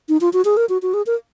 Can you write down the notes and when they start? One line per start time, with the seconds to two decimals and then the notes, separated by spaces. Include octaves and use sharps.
0.09 D#4
0.21 F4
0.33 F#4
0.45 G#4
0.57 A#4
0.69 F#4
0.82 F#4
0.94 G#4
1.06 A#4